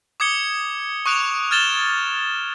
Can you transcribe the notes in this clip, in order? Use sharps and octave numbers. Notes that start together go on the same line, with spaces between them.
D6 D#6 G#6 C#7 G7
C#6 D#6 F#6 D7 E7 F7
F6 G#6 A6 E7 G7